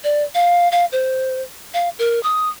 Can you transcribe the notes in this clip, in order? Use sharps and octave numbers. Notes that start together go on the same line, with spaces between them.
D5
F5
F5
C5
F5
A#4
D#6